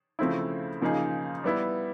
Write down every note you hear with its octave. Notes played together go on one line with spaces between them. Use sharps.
C#3 F3 A3 C4 E4
C#3 F3 A#3 D#4 G#4
G3 B3 E4